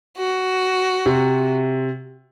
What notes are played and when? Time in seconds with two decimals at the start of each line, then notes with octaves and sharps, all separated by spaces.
0.18 F#4
1.06 C3